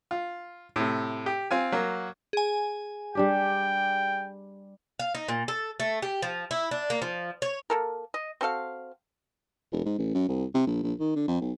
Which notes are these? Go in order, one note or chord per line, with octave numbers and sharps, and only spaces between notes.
F4
A2 C3
G4
C4 F4 G#5
F#3 A#3
G#4 G#5
G3 D4 G4 G5
F5
D#4
A#2
A4
A3
G4
F3
E4
D4
A#3
F3
C#5
A#3 A4 A#4
D#5
C4 F#4 A4 F5
E1
G#2
A1
F#2
C2
C3
A#1
A#1
D#3
D3
F2
B1